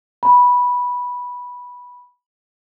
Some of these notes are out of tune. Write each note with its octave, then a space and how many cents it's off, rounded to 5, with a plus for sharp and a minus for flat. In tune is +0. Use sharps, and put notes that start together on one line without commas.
B5 -10